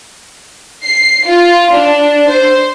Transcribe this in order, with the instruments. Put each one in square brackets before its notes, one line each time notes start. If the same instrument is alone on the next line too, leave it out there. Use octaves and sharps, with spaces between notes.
[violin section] C7
F4
D4
C5